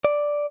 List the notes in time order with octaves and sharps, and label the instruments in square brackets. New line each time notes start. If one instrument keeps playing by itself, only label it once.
[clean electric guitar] D5